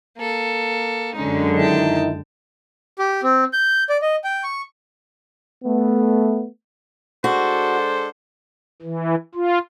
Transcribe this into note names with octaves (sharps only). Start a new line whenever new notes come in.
A#3 A4
F#2 D3 G#3 C#4 D#4
D#3 D#4 E4 G5 A5
G4
C4
G6
D5
D#5
G5
C#6
A3 B3
G#3 D4 F#4 A4 C5
E3
F4